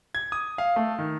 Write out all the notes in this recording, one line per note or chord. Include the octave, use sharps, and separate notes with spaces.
G#6
D#6
F5
A3
D#3